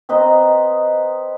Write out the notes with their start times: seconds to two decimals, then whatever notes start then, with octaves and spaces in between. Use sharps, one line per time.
0.09 C4 B4 D#5 A#5